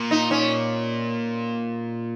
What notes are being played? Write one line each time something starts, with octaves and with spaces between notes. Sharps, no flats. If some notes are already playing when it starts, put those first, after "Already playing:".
Already playing: A#2
D#4
C#4